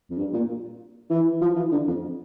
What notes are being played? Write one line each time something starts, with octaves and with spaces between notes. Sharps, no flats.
F2
G2
A#2
E3
F3
E3
D3
F2